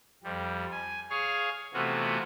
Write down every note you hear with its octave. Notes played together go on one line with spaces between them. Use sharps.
F2 G3
G#5
G#4 C#5 F5 F6
C3 E3 A3 B3 F4 F#4